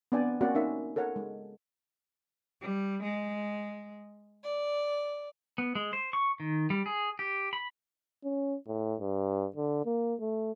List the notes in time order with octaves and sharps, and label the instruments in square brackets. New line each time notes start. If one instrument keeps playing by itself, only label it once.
[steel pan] B3 C4 D4 D5 G5 G#5
A#3 C4 C#4 F#4 D5 F#5
C#4 D#4 A#4 E5
A4 A#4 C#5 F#5
G#3
[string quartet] G3
G#3
D5
[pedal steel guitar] B3
G#3
C5
C#6
D#3
G3
G#4
G4
B5
[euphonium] C#4
A2
G2
D3
A#3
A3